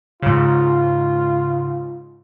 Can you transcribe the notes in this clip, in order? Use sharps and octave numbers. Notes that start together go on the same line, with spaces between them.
G#2 C#3 F4